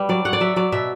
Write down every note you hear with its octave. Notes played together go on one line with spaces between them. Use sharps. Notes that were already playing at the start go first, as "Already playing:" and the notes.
Already playing: G3 B4
F#3 D5
F#3 F#5
D5
F#3 E5
F#3 D5
B2 E5